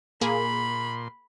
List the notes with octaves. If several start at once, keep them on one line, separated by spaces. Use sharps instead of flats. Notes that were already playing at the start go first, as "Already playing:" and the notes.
A#2 A#3 G#4 B5 C6